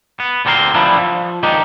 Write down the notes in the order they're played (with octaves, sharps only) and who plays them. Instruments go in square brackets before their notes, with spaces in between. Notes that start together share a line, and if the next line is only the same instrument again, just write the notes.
[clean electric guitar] B3
D2 D3 C4 A4 A#4 C6
F3 G3 B3 D4 E4
F3
D#3 G#3 D4 D#4 G4